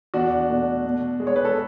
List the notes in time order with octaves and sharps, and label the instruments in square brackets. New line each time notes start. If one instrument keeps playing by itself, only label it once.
[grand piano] E2 D4 F#4
B2 A3
B2
G#3
C#5
B4
A4